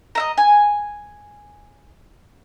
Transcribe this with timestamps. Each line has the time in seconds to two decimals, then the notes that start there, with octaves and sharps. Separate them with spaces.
0.15 D#5 E5 A#5
0.38 G#5